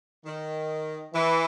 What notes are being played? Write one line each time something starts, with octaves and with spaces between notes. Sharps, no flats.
D#3
E3